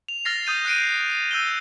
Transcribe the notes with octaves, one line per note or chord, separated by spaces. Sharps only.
F7
F6 A6 A#6 C7
D#6 G6 D#7
F#6 G6 C7 D7 D#7
E6 G6 D#7 G7